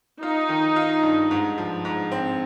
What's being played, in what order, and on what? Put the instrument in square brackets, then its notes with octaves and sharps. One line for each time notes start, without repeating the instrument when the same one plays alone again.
[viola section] D#4 [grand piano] F4
[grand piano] D#3
F4
G2
G#2
F3
G#2
C4